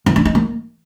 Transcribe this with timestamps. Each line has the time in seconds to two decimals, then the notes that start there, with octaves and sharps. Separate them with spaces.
0.06 E3
0.16 D4
0.25 D#4
0.35 A#3